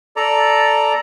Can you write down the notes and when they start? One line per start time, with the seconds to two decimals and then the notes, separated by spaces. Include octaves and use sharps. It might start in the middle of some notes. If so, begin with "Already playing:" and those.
0.16 A4 D5 A#5